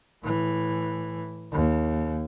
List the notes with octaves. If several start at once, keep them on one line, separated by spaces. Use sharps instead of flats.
A2 E3
D#2